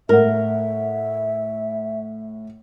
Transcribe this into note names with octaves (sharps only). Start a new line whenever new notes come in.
A2 A#4 E5 F#5